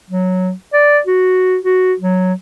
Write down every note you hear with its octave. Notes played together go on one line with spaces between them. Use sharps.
F#3
D5
F#4
F#4
F#3